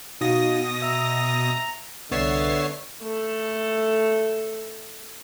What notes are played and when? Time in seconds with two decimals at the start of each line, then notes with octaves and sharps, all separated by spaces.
0.21 B2 D#4 F#4 F5 D#6 A#6
0.82 E5 A#5 E6
2.11 C2 D3 B3 C#5 E5 A6 C7
3.02 A3 A4